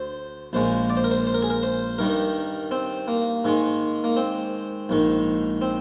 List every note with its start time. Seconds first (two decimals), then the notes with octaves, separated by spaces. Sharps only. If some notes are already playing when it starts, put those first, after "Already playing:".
Already playing: D2 D3 C5
0.53 A#1 A#2 G#3 C5
0.90 D5
0.97 C5
1.04 A#4
1.11 C5
1.27 C5
1.34 A#4
1.42 G#4
1.50 A#4
1.63 C5
1.98 G2 D#3 G3 A#4
2.71 C4
3.08 A#3
3.44 G#2 D#3 G#3
4.04 A#3
4.17 C4
4.89 A#1 G#2 D#3
5.61 C4